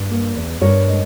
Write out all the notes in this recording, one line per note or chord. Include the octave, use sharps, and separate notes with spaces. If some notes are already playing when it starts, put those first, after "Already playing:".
Already playing: G2
A#3
E2
G2 A#4 C#5
G#3